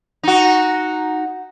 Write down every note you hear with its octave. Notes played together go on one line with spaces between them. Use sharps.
D#4 F#4